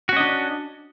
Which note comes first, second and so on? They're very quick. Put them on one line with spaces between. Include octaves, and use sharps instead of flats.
F#4 C#4 D#5 D4